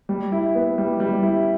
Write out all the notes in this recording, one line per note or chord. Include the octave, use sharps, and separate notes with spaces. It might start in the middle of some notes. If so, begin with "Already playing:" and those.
G3
E4
B3
G3
G3
E4